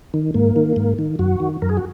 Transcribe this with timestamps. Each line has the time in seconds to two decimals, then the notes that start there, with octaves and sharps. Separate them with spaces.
0.14 D#3
0.34 G#2 A#3
0.56 D#3
0.76 G#2
0.99 D#3
1.19 F#2 F#4
1.40 D#3
1.62 F#2 A#4
1.69 G#4
1.77 F#4